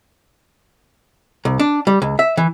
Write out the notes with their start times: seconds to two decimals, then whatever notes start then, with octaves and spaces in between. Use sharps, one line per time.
1.45 C2
1.59 D4
1.87 G3
2.02 C#2
2.19 E5
2.37 E3